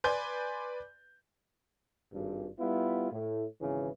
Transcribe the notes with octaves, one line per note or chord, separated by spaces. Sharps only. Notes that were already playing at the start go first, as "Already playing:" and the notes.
B4 D5 G#5 C6 G6
G#1 G2
G3 B3 E4 F4
A2
G#1 C#3 E3